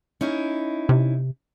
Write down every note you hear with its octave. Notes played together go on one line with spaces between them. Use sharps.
C#4 D#4 E4
C3